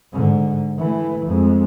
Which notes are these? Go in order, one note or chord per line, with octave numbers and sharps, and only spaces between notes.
G#2 D3
E3 A3
F2 G#3